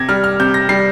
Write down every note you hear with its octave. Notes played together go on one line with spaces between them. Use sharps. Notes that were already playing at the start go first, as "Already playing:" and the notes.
Already playing: C3 G#6 A#6
G3 F6
F6
C3 G6
A#6
G3 C7